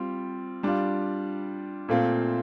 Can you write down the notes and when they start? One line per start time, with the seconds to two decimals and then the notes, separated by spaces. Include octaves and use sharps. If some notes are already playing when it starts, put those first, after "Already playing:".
Already playing: G3 C4 F4
0.63 G3 D4 F4
1.88 A#2 A3 C4 F4